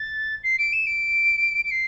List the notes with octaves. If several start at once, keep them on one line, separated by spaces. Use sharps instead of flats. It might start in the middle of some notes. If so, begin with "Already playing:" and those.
Already playing: A6
C7
D7
E7
D7
D7
C7